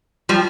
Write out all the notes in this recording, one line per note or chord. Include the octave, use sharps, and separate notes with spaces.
F3 G3